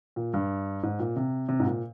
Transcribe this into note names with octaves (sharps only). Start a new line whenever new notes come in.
A#2
G2
G#2
A#2
C3
C3
G#2
A#2